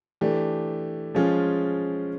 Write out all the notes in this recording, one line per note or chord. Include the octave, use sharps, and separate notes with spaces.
E3 A3 D4 G4
F3 G#3 C#4 F4 G#4